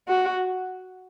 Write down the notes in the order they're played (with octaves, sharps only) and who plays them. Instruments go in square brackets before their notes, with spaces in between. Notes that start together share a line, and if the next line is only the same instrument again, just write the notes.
[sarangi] F#4